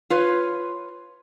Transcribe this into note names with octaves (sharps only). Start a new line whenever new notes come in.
F4 B4 C#5